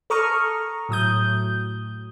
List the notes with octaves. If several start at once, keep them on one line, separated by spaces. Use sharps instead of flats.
A4 A#5 C#6 D#6 F6
A2 F#3 D#6 G6